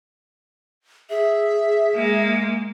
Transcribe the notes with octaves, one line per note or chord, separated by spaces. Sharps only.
G#4 E5
G#3 A#3